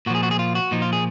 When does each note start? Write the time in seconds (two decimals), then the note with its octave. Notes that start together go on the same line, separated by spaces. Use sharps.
0.06 A#2 F#4
0.10 F3 G#4
0.23 F#4
0.31 G#4
0.39 F4
0.55 F#4
0.71 A#2 F3 D#4
0.82 F4
0.93 G#4